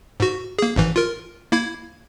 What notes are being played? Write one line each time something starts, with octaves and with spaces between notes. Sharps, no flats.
G#2 F#4
A#3 G#4
G#1 G#2 E3
F4 A#4
A#3 E4 G#6